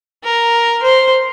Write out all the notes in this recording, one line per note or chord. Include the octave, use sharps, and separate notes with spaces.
A#4
C5